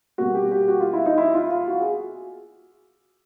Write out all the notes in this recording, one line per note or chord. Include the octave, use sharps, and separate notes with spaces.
B2 G3 A#3 F#4
G4
G4
F#4
F4
E4
D#4
E4
F4
F4
F#4
G#4